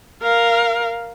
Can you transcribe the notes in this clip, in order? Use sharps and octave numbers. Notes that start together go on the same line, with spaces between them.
A#4 F5